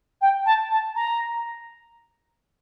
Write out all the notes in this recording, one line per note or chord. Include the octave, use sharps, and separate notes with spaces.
G5
A5
A5
A#5